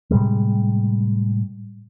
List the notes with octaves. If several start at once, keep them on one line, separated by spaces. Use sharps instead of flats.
A2 C3 G3 G#3